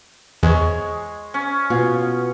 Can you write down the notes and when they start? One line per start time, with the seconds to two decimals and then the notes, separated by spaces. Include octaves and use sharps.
0.43 E2 G#3 C#5
1.34 C#4
1.70 B2 B3 F4